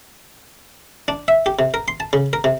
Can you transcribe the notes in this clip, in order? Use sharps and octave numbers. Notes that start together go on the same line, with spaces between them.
D4
E5
G4
C3
A#4
C6
A5
C#3
A#4
C3